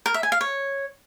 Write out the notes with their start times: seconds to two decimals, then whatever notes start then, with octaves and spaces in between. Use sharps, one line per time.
0.06 A#4
0.14 E5
0.23 G#5
0.32 F5
0.41 C#5